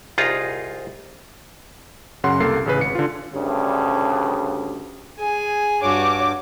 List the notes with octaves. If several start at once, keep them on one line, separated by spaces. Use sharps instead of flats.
C2 D#4 F4 G#4 A#5
F#2 C#3 F#5 C6
C2 A#3 A4 A#4 C7
A1 C#3 B4
G#1 C#7
D3 F4
D2 G2 C#3
G#4 G#5
G2 F#4 C#5 D6